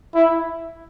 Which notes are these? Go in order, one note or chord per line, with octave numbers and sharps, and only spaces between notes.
E4